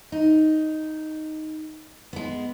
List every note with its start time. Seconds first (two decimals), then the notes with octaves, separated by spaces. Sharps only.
0.12 D#4
2.13 G#3 B3